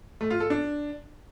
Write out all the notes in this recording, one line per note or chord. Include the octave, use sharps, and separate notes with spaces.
A3
F4
A4
D4